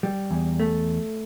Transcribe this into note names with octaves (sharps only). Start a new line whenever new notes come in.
G3
E2
A3